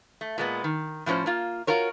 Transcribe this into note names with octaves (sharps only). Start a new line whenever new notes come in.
A3
A#2 G#3 B3
D#3
A2 F3 B3 C#4 C5
A#3 F4
F4 F#4 A#4 C#5